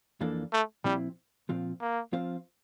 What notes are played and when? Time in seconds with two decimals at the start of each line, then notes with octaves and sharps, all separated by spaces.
0.21 F2 E3 A#3 D4 A4
0.53 A3
0.84 A#2 F3 G3 C4 E4
1.49 A#2 F3 C4 F4
1.81 A#3
2.13 F3 C4 F4 C5 F5